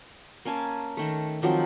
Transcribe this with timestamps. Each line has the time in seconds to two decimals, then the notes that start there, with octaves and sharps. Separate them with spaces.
0.45 A#3 C#4 G#5 A5
0.97 D#3 A3
1.42 D#3 F3 F#3 C4